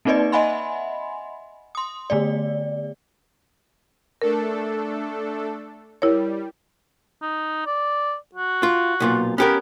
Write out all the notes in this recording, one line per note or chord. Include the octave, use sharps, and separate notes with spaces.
A#3 C4 D#4 B4 D5 D#5
D#5 E5 F#5 G#5 B5 C6
C6 D#6
D3 A3 B3 D5
A3 D4 A4 A#4
G3 E4 A#4 C#5
D#4
D5
F#4
F4
B1 A#2 F4
B3 C#4 G4 A#4